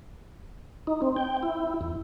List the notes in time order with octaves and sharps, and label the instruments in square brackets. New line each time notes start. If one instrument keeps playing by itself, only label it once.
[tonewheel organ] D#4
C4
G5
E4
E2